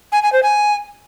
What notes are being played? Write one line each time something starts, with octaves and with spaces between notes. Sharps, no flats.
G#5
G#5
C5
G#5